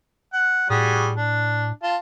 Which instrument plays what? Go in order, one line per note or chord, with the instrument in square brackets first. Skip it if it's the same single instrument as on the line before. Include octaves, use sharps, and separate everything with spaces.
[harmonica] F#5
[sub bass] A2 [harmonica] G3 F#4 G#4
[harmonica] D4
F4 A5